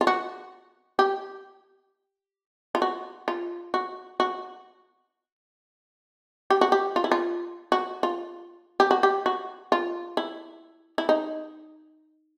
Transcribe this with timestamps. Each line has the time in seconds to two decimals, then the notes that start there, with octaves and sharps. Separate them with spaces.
0.01 F4
0.07 F#4
0.99 G4
2.75 F4
2.82 F#4
3.28 F4
3.74 F#4
4.20 F#4
6.50 G4
6.61 F#4
6.72 G4
6.96 F4
7.04 E4
7.12 F4
7.72 F#4
8.03 F4
8.80 G4
8.91 F#4
9.03 G4
9.26 F#4
9.72 F4
10.17 E4
10.98 E4
11.09 D#4